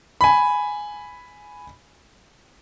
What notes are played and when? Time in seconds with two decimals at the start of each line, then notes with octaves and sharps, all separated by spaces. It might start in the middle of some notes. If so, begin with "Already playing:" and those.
0.21 G#5 B5